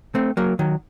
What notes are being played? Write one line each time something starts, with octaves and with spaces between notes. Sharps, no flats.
A3 C4
F#3 A#3
D#3 F#3